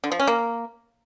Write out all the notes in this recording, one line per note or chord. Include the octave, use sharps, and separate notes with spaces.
D3
F3
C#4
A#3